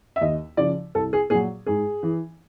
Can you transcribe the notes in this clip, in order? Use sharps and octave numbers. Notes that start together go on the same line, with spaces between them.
E5
D#2 D#5
C#3 F3 D5
C2 A4
G#4
A#2 F#3 G#4
G#2 G#4
E3